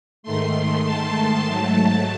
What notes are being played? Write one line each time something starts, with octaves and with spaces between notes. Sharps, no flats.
G#2 D#3 A3 C6
A5
G#2 F#3 A3